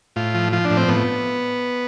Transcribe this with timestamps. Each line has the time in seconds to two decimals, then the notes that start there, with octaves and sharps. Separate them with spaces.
0.16 A2 F4
0.34 F3
0.53 F3 F4
0.65 D4
0.71 A2
0.77 C4
0.88 A2 B3